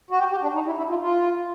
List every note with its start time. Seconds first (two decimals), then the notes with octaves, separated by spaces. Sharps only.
0.11 F#4
0.19 G4
0.31 G4
0.42 D4
0.54 D#4
0.66 E4
0.78 E4
0.90 F4
1.01 F4